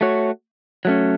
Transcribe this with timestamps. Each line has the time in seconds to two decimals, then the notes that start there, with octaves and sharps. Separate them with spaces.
0.01 A3 F#4 C#5
0.85 F#3 A3 C#4